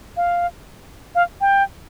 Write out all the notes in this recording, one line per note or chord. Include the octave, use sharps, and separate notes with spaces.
F5
F5
G5